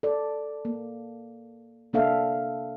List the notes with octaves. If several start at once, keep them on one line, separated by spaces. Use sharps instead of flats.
A4 D5
A#3
C3 A#3 D4 A4 E5 F5